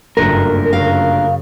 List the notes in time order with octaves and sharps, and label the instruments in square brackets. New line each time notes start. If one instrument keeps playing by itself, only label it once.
[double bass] F#1 G2 [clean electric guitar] A#2 D3 A3 [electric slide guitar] A#4
[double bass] F#2 C#3 [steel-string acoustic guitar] F5